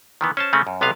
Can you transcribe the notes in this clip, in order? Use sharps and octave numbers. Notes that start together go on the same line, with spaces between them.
D#3 E3 B3
C#4 C5 A5
C#3 A3 C4 C#4
F#2
B1 C3 B3 D#5 F5